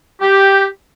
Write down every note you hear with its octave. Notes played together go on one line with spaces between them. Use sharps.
G4